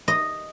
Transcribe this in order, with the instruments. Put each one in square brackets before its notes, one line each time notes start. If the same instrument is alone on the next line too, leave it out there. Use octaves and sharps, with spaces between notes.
[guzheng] D#5